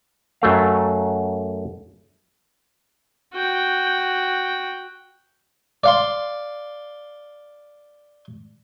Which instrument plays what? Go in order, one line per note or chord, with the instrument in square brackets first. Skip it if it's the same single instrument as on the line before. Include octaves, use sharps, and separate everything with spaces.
[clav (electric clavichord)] F#2 F#3 A3 F5
[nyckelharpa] F#4 G5
[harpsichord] D5 F5 C6